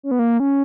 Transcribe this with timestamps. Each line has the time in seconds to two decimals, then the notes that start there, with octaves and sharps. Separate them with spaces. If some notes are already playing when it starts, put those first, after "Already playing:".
0.03 C#4
0.11 B3
0.19 A#3
0.40 C#4